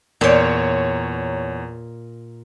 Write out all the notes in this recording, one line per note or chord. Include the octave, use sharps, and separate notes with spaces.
E2 A#2 C#5 G5